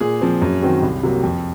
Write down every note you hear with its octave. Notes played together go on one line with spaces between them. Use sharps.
A#2 G#4
F3 C4
F#2
D#3 F#3 C4
C2
C3 F#3 A#3
F2